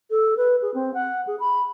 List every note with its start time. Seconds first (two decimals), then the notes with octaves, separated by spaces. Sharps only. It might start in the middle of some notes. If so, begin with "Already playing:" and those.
0.10 A4
0.37 B4
0.62 G#4
0.74 C4
0.94 F#5
1.27 G#4
1.40 B5